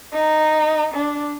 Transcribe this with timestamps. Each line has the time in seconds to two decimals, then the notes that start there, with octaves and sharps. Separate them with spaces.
0.13 D#4
0.95 D4